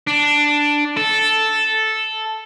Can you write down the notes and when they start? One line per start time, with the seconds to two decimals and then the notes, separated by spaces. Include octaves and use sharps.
0.07 D4
0.97 A4